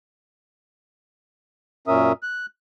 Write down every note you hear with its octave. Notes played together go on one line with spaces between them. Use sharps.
F#2 A#2 C#4 A#4 E5 D#6
F#6